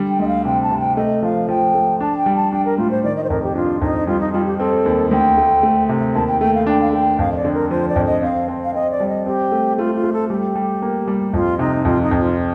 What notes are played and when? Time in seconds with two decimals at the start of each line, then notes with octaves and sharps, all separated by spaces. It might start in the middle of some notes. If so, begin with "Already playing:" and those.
Already playing: D3 G3
0.10 G5
0.19 D2 D#5
0.28 F5
0.45 C3 G5
0.63 A5
0.71 C3
0.80 G5
0.97 A3 D#5
1.22 F3 F5
1.49 F3 G5
1.75 A3
2.00 D4 A5
2.17 G5
2.26 G3
2.36 A5
2.52 D4 G5
2.65 A#4
2.78 A2 F4
2.91 C5
3.04 D#3 D5
3.17 D#5
3.24 C5
3.30 F2 A#4
3.44 G4
3.55 D4 F4
3.81 F2 D#4
4.07 G3 F4
4.21 D#4
4.33 G3 F4
4.46 G4
4.59 C4 A4
4.86 D#2
5.11 D2 G5
5.37 A3
5.63 A3
5.89 C3
6.15 D#2 A5
6.28 G5
6.41 A3 G5
6.55 F5
6.67 D4 G5
6.81 F5
6.93 A3 G5
7.19 F2 F5
7.32 D#5
7.36 D5
7.45 D3
7.54 A#4
7.70 F3 C5
7.88 D5
7.96 F2
8.05 D#5
8.22 C4 F5
8.48 C4
8.64 F5
8.74 C4 D#5
8.91 D5
9.00 G3
9.09 D#5
9.26 C4 G4
9.52 A3
9.78 A3 F4
9.95 F4
10.04 A3
10.13 A4
10.30 G3 G4
10.56 G3
10.82 A#3
11.08 G3
11.33 F2 F4
11.59 C3 D#4
11.85 F2 F4
12.02 D#4
12.11 F2
12.20 F4